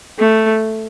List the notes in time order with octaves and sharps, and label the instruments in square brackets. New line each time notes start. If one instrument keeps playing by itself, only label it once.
[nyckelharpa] A3